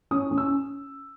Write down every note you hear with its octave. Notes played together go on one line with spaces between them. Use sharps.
C#4 D#6
C#4
E6